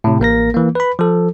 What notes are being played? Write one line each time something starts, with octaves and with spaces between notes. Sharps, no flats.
A2 C3
A1 A#3 A#4 A#6
E3 A#3
B4 B5
F3 A4